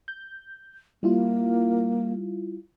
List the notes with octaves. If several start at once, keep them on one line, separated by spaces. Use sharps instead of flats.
G6
G3 A#3 E4 F4